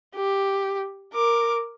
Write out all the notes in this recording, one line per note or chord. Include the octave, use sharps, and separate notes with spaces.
G4
A#4 D6